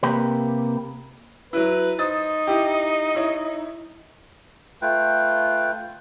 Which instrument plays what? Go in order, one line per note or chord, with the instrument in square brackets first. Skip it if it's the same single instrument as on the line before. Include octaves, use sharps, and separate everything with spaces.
[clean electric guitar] C3 A#3 G4 B4
[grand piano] F#3 E4 [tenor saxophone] B4
[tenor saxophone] D#4 [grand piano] C5 D#6 A6
[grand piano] E4 G4
E4 C#5 E5
[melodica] A3 F4 B4 G5